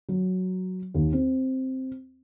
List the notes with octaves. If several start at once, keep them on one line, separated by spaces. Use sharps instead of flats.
F#3
D#2
C4